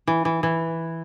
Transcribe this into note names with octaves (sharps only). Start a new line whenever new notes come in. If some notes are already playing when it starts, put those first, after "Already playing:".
E3
E3
E3